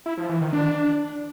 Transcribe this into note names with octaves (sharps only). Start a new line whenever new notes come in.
E4
F3
E3
D#3
D4